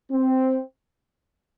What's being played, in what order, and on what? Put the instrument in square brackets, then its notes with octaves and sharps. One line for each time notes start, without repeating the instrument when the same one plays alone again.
[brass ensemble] C4